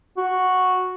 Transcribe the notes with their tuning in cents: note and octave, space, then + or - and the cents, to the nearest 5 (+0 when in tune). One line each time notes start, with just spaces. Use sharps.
F#4 -5